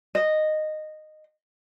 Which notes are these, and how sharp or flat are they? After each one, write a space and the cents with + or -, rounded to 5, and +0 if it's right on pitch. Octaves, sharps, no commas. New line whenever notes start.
D#5 -10